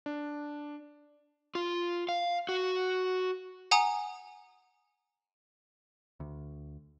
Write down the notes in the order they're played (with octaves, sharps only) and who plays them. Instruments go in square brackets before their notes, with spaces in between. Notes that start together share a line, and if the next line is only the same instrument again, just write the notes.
[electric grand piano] D4
[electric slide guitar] F4
F5
F#4
[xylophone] F#5 G#5 A#5 D#6
[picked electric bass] D2